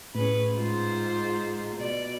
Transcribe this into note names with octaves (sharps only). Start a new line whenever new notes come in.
A2 C#4 G#4 B4
G#2 F4 C5
B2 D5